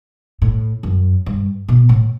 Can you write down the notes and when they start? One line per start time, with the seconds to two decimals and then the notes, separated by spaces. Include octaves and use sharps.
0.42 A2
0.83 F#2
1.26 G2
1.68 B2
1.89 A2